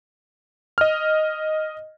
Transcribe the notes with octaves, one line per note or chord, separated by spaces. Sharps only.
D#5 F6